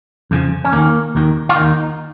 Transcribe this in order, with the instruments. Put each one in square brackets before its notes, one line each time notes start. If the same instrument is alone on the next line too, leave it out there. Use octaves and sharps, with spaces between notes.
[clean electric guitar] F2 C#3 F3
C#4
D#2 D#3 A#3
D#2 D#3
F4
D#2 D#3 D#4